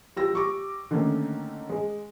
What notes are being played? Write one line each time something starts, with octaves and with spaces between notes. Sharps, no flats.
G3 F4 G4 E6 A#6
G3 C#6 D6
D3 D#3 A3 A#3 C#4
G#3